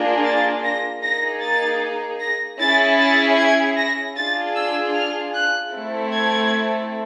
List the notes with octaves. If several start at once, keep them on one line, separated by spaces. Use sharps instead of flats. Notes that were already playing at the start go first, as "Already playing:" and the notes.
Already playing: A#3 D4 F4 G#4
A6
A#6
A#3 D#4 G#4 A#6
A6
A#6
C#4 E4 G#4 A6
A6
G#6
A#6
D4 F4 G#4 A6
E6
F6
F#6
A3 C4 E4 A4
G#6